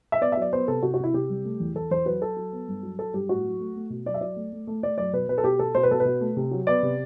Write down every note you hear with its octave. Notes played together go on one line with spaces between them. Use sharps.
E5
B3 D5
E5
F#3 D5
B3 C5
C3 A4
C3 F#4
F#4
C3 E4
C3 G4
G3
A3
E2
E2 A4
E2 C5
F#3 B4
F#3 A4
F#3
B3
G2
F#3
F#3 A4
G2 G4
A2 F#4
F#3
A3
A3
B2
F#3 D5
E5
F#3 D5
A3
A3
A3
A3 D5
F#2 D5
B2 B4
B2 B4
A4
B2 G4
B2 A4
B2 C5
B4
B2 A4
B4
B2
A3
C3
F#3
B3 D5
C3